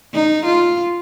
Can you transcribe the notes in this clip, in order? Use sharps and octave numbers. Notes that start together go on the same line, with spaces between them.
D#4
F4